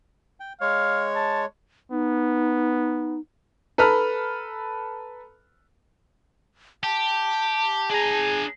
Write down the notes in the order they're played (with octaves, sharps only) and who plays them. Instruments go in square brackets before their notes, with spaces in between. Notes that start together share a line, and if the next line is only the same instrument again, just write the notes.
[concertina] G5
[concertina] G#3 C#5 [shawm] F5
[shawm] A5
[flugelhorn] B3 [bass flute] D#4
[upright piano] A4 B4 A#5 B5 F6
[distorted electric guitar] G4 [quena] A5
[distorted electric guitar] D4 A#5 [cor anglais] G#4